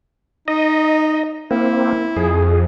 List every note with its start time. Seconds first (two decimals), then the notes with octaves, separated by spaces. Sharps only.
0.48 D#4 D#5
1.51 A#3 C4 E4
2.16 F2 G#4